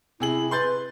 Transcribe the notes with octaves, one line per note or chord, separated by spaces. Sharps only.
C3 E4 G#4 F#7
B4 C6 G6 A6